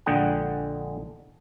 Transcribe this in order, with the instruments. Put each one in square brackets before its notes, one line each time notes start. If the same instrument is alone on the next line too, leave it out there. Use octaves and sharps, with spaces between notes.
[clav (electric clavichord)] A#1 D3 G#3 D#5 F#5 G5